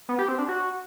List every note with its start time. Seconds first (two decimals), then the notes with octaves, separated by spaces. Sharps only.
0.09 B3
0.19 G4
0.29 C4
0.38 D4
0.48 F#4